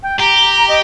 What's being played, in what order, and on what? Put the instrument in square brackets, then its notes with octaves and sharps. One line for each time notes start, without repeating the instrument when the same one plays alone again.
[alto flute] G5
[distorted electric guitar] G4 [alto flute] A#5
[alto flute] D#5